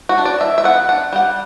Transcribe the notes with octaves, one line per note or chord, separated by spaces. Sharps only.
F#4
D4
D5
E3 E5
E5
B3 F#5
D4 F#5
G3 F#5